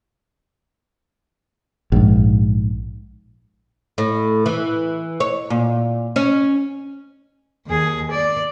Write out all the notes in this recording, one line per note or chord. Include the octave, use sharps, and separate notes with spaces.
A#1 G#2
A2
E3
C#5
A#2
C#4
D#2 G#4
D5